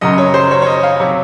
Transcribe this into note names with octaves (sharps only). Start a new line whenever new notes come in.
F#2 C#3 F#3 D#5
C#5
C5
C#5
C#5
D#5
F5
C3 F#3 C#5